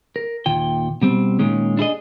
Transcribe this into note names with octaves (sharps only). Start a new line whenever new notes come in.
A#4
D#2 A#2 G5
B2 G3 C4
A#2 D#3 G#3 C#4
D4 E4 G#4 D#5